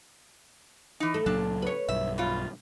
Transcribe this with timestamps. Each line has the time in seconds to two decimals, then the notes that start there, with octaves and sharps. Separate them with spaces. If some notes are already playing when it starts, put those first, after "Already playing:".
1.00 E3 D#4
1.14 A3
1.26 C#2 A#2 F#3 A#3 D4 A5
1.62 B4 C#5
1.88 B1 G2 E5
2.18 B2 F4